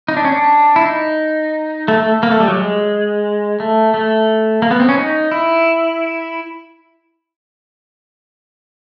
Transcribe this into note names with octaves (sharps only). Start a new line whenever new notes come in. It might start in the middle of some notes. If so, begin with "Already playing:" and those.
D#4
D4
C#4
D4
E4
D#4
A3
A3
A#3
A3
G3
F#3
G#3
A3
A3
A#3
B3
C4
C#4
D#4
E4